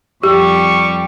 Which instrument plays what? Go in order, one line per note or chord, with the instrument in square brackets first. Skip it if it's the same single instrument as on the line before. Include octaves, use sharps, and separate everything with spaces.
[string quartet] F2 G3 [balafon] G4 [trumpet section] C#6